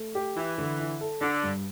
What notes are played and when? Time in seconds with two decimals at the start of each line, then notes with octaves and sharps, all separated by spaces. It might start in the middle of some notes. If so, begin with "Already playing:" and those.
Already playing: A3
0.15 G4
0.36 E3 E4
0.58 D3
0.79 E4
1.01 A4
1.21 D3 D4
1.43 G2